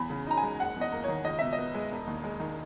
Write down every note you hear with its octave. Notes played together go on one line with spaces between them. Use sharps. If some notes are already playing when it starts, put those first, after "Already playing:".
Already playing: E2 B5
C#3
D#4 A#5
G#5
G#3
F#1 F#5
E2
D#5
A#3
D#3 C#5
C#2 D#5
B2 E5
D#5
B3
G#3
E1
D#2
G#3
D#3